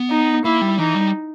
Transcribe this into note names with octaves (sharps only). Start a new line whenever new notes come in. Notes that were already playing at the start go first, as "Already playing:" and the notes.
Already playing: B3
D#4
A#3 E4
G3
E3 D#4
G3